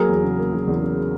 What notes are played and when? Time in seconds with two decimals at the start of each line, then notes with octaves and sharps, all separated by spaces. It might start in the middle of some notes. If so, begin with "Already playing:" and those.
Already playing: F#3 A#3 G#4 A#4
0.09 E2
0.24 C#3
0.39 A#3
0.53 F#3
0.67 E2
0.82 C#3